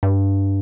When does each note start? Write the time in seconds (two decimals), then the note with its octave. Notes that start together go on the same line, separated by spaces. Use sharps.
0.03 G2